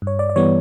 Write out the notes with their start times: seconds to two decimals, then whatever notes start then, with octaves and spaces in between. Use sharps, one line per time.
0.02 G2
0.07 C#5
0.19 D5
0.29 D5
0.36 E3 G3 B3 C#5